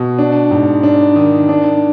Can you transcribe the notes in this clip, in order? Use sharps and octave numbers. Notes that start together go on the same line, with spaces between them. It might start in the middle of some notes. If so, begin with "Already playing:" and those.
Already playing: B2
D4
G#2
D4
D#3
D4